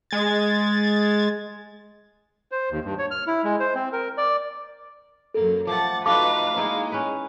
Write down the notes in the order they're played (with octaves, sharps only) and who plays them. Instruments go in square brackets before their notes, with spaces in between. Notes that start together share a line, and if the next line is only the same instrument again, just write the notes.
[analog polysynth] G#3 G#6 A6
[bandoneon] C5
D#2
G2
C#5
F6
E4
G#3
C5
C4
A#4
D5
[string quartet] F#2 A#3 [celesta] A4
[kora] F3 A3 [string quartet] F#5 A6 [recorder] D6
[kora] A3 F4 F#4 [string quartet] D#4 B4 [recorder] F5 [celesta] D6
[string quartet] G#3 [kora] A#3 D#4 E4
[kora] C#4 B4